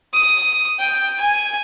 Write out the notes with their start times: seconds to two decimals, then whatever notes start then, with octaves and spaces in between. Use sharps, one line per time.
0.14 D#6
0.80 G5
1.20 G#5